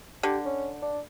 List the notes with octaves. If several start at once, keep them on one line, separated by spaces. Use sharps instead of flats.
D3 G4
C#4
D4